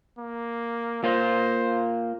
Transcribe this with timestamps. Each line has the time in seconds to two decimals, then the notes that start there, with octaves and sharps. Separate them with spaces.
0.18 A#3
1.04 A#3 F4 C5